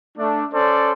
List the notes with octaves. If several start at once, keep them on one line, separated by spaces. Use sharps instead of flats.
A3 D4
C#4 A4 C5 D5